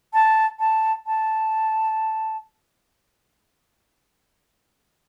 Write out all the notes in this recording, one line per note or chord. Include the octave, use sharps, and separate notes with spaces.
A5
A5
A5